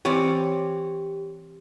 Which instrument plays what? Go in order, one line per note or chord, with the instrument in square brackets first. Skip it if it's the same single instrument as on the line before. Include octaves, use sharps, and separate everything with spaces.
[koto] E3 G3 [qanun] C4 C#5 D5 [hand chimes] G4